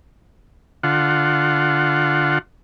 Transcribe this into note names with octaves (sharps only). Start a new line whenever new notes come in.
D3 F4 F#5